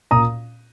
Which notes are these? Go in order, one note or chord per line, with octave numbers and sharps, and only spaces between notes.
A#2 A#5 D#6